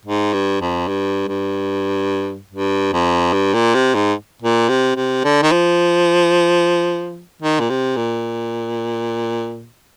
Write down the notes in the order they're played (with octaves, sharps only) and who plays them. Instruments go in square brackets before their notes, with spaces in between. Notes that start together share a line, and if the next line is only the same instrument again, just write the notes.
[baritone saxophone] G#2
G2
F2
G2
G2
G2
F2
G2
A#2
C3
G#2
A#2
C3
C3
D3
D#3
F3
D#3
A#2
C3
A#2